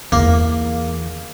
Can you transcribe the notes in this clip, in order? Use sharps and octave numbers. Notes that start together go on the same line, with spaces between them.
E2 E3 A#3